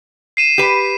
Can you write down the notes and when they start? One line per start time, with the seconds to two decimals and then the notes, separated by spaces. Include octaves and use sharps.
0.37 C7 D#7 E7
0.58 G4 B4